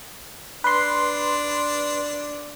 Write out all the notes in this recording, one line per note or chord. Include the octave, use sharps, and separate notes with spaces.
D4 B4 C6